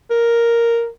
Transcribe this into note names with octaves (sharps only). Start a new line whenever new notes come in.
A#4